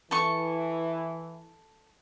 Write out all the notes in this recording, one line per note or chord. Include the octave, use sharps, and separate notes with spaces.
E3 A4 C#6